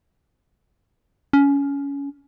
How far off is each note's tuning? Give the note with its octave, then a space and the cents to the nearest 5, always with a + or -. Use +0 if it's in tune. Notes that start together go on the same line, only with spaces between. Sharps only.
C#4 +20